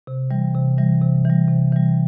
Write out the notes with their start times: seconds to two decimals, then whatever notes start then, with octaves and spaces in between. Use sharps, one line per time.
0.07 C3
0.31 E3 G3
0.54 C3
0.78 E3 G3
1.02 C3
1.25 E3 G3
1.48 C3
1.72 E3 G3